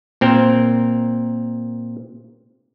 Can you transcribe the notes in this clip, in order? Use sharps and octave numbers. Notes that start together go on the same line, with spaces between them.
A#2 C4 A#4